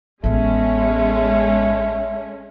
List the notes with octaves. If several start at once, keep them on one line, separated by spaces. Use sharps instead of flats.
A1 G#3 A3 B3 C#4